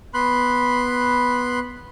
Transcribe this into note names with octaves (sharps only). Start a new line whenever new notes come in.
B3 B5 C6 F#6